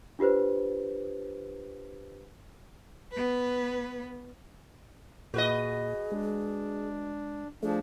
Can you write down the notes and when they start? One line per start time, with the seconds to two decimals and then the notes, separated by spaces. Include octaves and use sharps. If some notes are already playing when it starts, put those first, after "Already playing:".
0.19 D4 F4 G4 B4 C5
3.11 B3 B4
5.34 A#2 F#4 G#4 B4 D#5
6.12 G#3 D4
7.63 F3 A3 D4 G#4